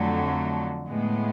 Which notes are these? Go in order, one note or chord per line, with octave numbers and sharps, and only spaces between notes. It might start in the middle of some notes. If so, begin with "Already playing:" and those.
Already playing: F2 D3 F#3 A3
A2 G#3 B3